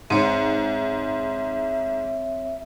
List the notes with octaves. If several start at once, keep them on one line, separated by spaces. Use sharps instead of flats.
G#2 C4 C#5 E5